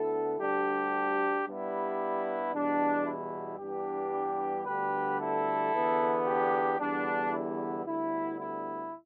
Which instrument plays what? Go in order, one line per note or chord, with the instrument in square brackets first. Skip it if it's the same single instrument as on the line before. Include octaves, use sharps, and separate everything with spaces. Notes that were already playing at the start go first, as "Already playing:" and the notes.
Already playing: [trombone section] D2 D3 B3 E4 A4
D2 D3 G3 D4 G4
G2 G3 B3 E4
E2 B2 G3 D4
E4
G2 E3 G3 B3 D4 G4
D2 D3 G3 B3 G4 B4
E4 A4
E2 D3 B3
D4 G4
E2 D3 G3 B3 D4
E4
D2 D3 G3 B3 E4
E4